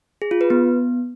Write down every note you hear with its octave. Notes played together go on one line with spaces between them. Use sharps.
G#4
F4
B4
B3